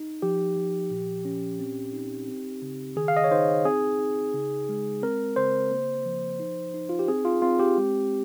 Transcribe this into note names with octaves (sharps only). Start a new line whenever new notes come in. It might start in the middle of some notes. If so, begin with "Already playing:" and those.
Already playing: D#4
F3 G4
F3
A#2
C#4
C4
D#4
C4
C#3
D#3 G#4
F5
D#5
C#5
D#4 C5
C4 G#4
D#4
C#3
G#3
C4 A#4
C#3 C5
A#3
F3
D#4
D#4
F4
G4
C4 G#4
F4
C4 F4
G4
G#3